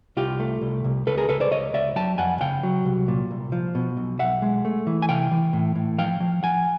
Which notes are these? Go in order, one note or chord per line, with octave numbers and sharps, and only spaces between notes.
C2 F4 G4
A3
C2
C2
C#2 A4 B4
G#4 A#4
C#2 A4 B4
C5 D5
C#2 C#5 D#5
C#2 D5 E5
F#3 G5 A5
F2 F#5 G#5
C#3 F5 G5
F#3
C2
A#2
C2
F3
B2
B1
B1 E5 F#5
G#3
A3
E3
G#5
C3 F5 G5
E3
A2
A2
F3 F5 G5
F3
F3 F#5 G#5